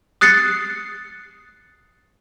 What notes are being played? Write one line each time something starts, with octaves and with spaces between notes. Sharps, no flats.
D#6 F#6 A6 C7 C#7